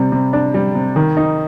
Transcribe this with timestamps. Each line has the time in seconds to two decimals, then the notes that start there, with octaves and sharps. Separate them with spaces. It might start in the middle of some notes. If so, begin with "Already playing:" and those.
Already playing: C3 G3
0.12 C3
0.33 D4
0.54 G3
0.75 C3
0.96 D#3
1.17 D#4